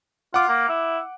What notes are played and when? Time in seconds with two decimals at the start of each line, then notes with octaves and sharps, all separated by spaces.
0.34 F4 F#5 D6
0.48 A#3
0.69 E4